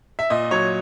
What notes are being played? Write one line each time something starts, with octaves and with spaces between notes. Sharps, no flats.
E5
A#2 D#5
F#3 C#5